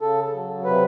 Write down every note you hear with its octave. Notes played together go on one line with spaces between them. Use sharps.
C#3 A4
F#3
C3 B4